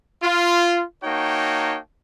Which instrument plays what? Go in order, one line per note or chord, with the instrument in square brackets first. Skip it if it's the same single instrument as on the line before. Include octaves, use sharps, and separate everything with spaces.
[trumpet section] F4
A#3 D#4 F#4 C#5 G5 A5